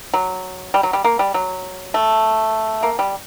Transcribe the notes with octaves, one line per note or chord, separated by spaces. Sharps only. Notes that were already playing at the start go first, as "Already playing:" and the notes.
F#3
G3
F#3
G3
A#3
G3
F#3
A3
A#3
G3